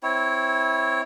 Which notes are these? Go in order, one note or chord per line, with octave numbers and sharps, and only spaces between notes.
C4 E4 C#5